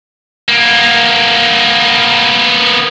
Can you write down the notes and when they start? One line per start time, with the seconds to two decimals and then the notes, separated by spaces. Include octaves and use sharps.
0.48 A#3 B3